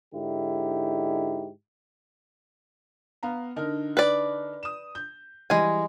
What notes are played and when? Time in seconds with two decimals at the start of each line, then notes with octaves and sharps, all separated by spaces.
0.14 G#2 D3 D#4 E4 G4
3.23 B3 F5 A#5
3.56 D3 D#4 A#4
3.97 B4 D5
4.63 D#6 E7
4.95 G6
5.50 E3 G3 G#3 G#5